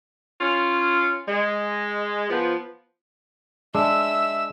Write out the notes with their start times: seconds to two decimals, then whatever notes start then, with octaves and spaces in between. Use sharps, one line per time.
0.40 C#4 F4
1.27 G#3
2.30 F3 B3
3.75 G#3 D4 E5 E6